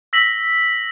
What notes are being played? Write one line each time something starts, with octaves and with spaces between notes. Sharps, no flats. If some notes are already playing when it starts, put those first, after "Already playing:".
E6 A#6 B6 F#7